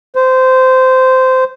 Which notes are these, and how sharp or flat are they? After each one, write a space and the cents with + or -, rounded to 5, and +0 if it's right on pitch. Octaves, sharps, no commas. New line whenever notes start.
C5 -15